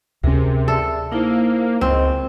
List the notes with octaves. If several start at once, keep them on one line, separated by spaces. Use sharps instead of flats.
D2 C3 C#4 G#4 A#4
G#4 A4 D5 E5
A#3 D#4 E4 C5
C#2 C4 D#5